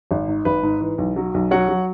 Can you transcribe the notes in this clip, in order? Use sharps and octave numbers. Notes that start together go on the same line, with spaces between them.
G#1
G#2
G#1 B4
G#2
E3
B1
F#3
B1
F#3 C#5 F#5
F#3